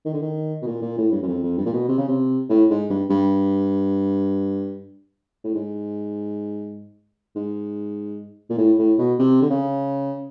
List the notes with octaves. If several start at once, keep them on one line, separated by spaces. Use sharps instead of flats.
D#3
D3
D#3
B2
A#2
A#2
A2
G2
F#2
F2
F2
G2
A#2
B2
C3
C#3
C3
A2
G#2
G2
G2
A2
G#2
G#2
A#2
A2
A2
B2
C3
D3
C#3